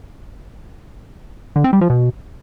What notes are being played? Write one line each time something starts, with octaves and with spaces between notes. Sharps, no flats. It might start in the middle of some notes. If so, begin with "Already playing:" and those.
D3
C4
G3
F3
B2